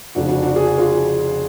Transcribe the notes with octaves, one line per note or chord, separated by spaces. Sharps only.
F1 F2 C#3 D4 F#4
D4 F#4
D4 F#4
G#4
F#4
F4 G#4